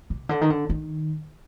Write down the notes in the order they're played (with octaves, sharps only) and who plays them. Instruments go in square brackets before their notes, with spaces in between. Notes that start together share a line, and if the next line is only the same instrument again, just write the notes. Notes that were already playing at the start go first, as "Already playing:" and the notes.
[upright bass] C3
D3
D#3
D3
D#3